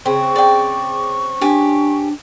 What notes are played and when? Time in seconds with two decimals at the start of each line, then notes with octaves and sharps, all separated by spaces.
0.06 C#3 C4 C#6
0.36 D5 G5
1.41 D4 G4 G#5